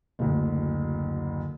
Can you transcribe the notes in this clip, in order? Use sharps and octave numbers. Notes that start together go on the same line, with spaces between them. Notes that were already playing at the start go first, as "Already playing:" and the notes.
F#1 D2